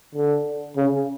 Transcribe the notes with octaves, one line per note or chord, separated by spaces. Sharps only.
D3
C#3